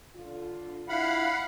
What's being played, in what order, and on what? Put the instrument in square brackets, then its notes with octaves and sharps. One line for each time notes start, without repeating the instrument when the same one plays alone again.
[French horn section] D3 F4
[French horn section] D4 E4 F4 [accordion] F5 F#5 B5